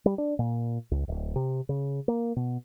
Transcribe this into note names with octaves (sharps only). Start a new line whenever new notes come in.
G3
D4
A#2
C#2
D1
C3
C#3
A#3
B2